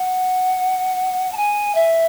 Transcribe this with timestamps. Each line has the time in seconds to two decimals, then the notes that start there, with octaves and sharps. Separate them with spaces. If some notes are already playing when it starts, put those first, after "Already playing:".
Already playing: F#5
1.32 A5
1.37 G#5
1.75 E5